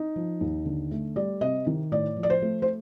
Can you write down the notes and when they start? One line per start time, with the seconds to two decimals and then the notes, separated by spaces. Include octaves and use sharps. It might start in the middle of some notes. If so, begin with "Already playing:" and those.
Already playing: D#4
0.16 F3
0.41 D#2
0.65 D3
0.91 A3
1.16 G3 D5
1.41 C3 D#5
1.67 D#3
1.92 A2 D5
2.17 F3
2.23 D5
2.30 C5
2.42 A3
2.62 C5